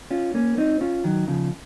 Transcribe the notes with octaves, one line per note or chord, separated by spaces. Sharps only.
C#4 F4
A#3 C#4
C4 D#4
C#4 F4
D#3 F#3
C#3 F3